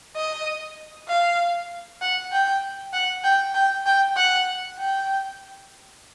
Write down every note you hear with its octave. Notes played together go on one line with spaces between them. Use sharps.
D#5
F5
F#5
G5
F#5
G5
G5
G5
F#5
G5